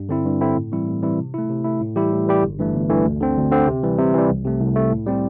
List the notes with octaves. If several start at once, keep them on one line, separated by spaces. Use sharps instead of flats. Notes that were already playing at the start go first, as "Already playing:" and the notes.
Already playing: G2
D3 C4 E4
G2
D3 C4 E4
A2
E3 G3 C4 E4
A2
E3 G3 C4 E4
C3
A3 E4
C3
A3 E4
A2
E3 G3 E4 G4
A2
E3 G3 E4 G4
G1
G2 E3 A3
G1
G2 E3 A3
D2
D3 C4
D2
D3 C4
C3
E3 G3
C3
E3 G3
C2
C3 A3
C2
C3 A3
A2
G3 C4 E4 G4